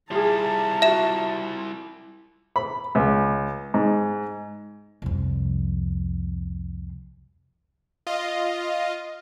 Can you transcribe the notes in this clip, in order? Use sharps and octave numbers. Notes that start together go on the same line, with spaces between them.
G3 E4 F4 G#4 A5 A#5
F4 F#4 E5 E7
B5
C#2
G#2
C2 F2
F4 D#5